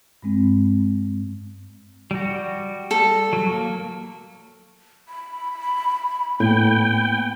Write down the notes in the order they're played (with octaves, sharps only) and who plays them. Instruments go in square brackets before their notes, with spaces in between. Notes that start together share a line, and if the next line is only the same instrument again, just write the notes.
[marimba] G2 G#3 C4
[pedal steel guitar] G3 F#4
[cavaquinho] A4
[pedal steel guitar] F#3
A#3
[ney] B5
[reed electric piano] A2 [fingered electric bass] A#3 B3 [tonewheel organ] G5